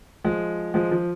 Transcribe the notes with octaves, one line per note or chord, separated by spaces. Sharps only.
F3 G#3
F3 G#3
F3